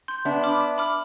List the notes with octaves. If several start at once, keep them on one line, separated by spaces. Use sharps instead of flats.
C6 G6
B3 D4 E5
B5 D6 F6
E5
B5 D6 F6